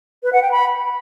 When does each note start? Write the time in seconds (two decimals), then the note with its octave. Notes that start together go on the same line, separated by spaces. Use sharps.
0.23 B4
0.33 F#5
0.42 G5
0.52 B5